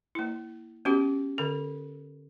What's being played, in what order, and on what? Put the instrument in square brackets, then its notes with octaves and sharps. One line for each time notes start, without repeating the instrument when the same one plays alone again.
[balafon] A#3 E4
B3 C#4 F#4 G4
D3 A4